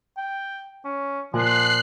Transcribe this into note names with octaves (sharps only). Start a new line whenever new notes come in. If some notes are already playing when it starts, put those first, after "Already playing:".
G5
C#4
A#2 F3 F#6 C7